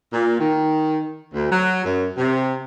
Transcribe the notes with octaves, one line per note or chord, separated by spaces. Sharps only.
A#2
D#3
D2
F#3
F#2
C3